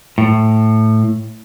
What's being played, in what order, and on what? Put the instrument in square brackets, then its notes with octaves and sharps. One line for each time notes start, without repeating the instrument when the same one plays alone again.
[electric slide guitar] A2